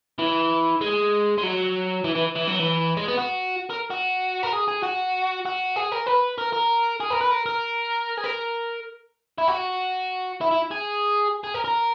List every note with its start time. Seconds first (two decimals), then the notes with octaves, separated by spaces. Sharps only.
0.19 E3
0.81 G#3
1.38 G#3
1.43 F#3
2.04 E3
2.15 E3
2.36 E3
2.48 F#3
2.60 E3
2.97 G#3
3.08 B3
3.17 F#4
3.70 A#4
3.90 F#4
4.43 A#4
4.53 G#4
4.68 G#4
4.83 F#4
5.45 F#4
5.76 G#4
5.92 A#4
6.06 B4
6.38 A#4
6.53 A#4
7.00 G#4
7.11 A#4
7.21 B4
7.31 A#4
7.46 A#4
8.18 G#4
8.24 A#4
9.38 E4
9.48 F#4
10.41 E4
10.51 E4
10.71 G#4
11.44 G#4
11.54 A#4
11.64 A#4